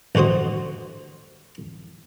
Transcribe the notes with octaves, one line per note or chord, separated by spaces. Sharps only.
A1 D3 F#4 C5 D#6